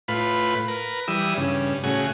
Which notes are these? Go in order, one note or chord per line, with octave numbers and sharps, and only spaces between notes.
A2 F4 B4 B5
A#4 B4
E3 G3 D#6 E6
G2 C#3
A2 C#3 F#4 G#4